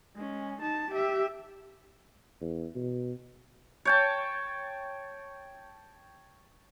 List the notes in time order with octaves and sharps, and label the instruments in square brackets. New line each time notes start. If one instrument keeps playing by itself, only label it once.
[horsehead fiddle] G#3 C#4
D#4 A5
G4 E5
[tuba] E2
B2
[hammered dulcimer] C#5 G5 A5